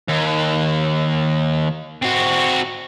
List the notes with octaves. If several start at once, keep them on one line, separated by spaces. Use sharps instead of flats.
D#2
C4 F#4